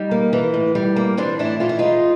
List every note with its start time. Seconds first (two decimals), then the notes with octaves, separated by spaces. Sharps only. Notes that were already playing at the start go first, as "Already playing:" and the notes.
Already playing: G3 D#4
0.11 A#3
0.33 E3
0.54 A2
0.75 G3
0.96 A#3
1.17 E3 C4 D4
1.39 A2 D4 E4
1.60 E3 F4
1.69 E4
1.79 G#3 D#4 F4